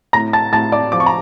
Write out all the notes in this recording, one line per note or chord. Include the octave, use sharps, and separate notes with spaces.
A2 A#5 A#6
A5 A6
A2 A5 A6
D5 D6
F3 D6
C#6
A#5